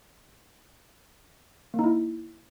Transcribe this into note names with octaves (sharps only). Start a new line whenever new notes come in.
A#3
D#4
E4